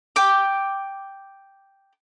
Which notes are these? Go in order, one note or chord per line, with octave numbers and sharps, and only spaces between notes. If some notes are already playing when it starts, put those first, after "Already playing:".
G5 D6